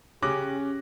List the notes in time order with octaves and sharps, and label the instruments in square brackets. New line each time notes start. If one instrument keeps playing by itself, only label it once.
[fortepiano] C#3 [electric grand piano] C#4 F#6 A#6 [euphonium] G4 [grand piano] D6